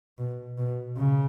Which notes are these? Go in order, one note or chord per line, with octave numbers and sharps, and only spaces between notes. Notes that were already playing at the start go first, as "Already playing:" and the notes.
B2
B2
C#3